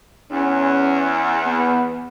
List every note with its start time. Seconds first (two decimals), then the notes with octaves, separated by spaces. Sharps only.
0.31 E2 C#4
1.46 B3